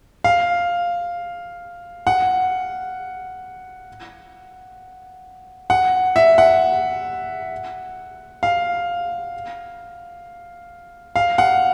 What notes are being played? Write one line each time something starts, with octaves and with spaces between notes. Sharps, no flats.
F5
F#5
F#5
E5
F#5
F5
F5
F#5